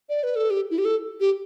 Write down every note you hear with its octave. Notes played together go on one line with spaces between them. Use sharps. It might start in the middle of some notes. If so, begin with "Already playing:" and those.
D5
B4
A4
G4
E4
G4
A4
G4